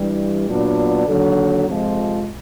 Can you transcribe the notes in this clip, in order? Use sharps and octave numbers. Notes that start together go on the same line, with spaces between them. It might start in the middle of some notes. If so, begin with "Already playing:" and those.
Already playing: G2 E3 G3
A#2 F#3 B3 D4
D#2 D3 F#3
F2 C3 F3 G#3